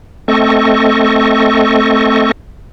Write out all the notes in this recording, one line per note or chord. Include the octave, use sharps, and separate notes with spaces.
A3 C4 A4 D#5 C#6